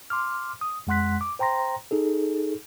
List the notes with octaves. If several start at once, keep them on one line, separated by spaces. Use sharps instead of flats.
C6 D6 F6
D#6
F2 G#3 F#5 C6 F#6 B6
D6
C5 G5 A#5 C6 A#6
D#4 G#4 A4